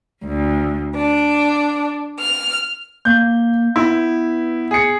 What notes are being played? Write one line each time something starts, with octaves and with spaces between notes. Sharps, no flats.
D2
D4
F6
A#3 G6
B3 E4
G#4 C#7